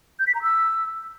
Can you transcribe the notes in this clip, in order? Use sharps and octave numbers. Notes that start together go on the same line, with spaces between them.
G6
B6
A#5
E6